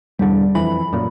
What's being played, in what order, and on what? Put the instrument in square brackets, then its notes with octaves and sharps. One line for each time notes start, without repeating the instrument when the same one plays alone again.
[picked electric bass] E1 E2 D3 [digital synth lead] G3
[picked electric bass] F2 E3 [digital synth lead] B5
[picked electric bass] F#2 A#2